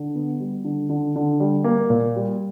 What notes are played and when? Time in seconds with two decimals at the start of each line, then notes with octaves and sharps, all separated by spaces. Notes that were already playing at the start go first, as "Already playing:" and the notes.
Already playing: D3
0.15 B3
0.40 G3
0.64 D3
0.89 D3
1.16 D3
1.40 G3
1.64 A#3
1.90 A#2
2.16 G3